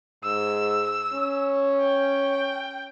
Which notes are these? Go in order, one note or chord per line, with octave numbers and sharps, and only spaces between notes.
G#2 E6
C#4
G5